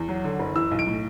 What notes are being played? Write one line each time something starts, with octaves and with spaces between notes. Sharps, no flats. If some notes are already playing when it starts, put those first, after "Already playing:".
Already playing: E2
F#3
D3
F#1
E3 E6
B1
D7
A2